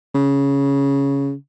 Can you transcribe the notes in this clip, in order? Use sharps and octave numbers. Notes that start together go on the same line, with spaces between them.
C#3